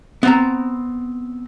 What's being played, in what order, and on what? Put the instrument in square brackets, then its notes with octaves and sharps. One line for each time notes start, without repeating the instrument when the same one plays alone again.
[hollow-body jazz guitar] B3 C4 A#5